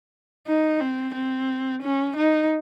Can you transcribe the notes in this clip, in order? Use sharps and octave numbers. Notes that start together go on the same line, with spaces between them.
D#4
C4
C4
C#4
D#4